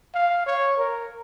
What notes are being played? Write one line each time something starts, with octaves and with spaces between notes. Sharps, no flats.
F5
C#5
A#4